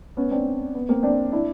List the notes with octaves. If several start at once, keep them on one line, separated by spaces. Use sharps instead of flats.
B3 C#4
C4 D4
B3
A#3 C4
C4 D4
D4 E4